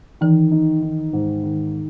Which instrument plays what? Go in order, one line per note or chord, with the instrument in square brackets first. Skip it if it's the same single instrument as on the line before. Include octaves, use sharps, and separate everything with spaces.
[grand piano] D#3 [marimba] E3
[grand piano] D#4
D#3
G#2
D#3